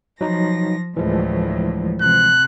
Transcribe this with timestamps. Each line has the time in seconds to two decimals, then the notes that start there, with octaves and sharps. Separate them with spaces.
0.21 F3 F#3 D#4 A#6
0.97 D2 A2 E3 F3 G#3
2.01 C3 F#6